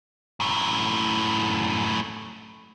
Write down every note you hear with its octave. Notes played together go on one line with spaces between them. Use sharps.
F#2 A2